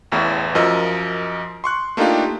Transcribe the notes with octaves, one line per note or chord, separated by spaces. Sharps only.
A1 E2 A2 E4
F#2 F3 A#4 D#5 E6
C6 C#6 F#6
A3 A#3 D4 D#4 F4 G4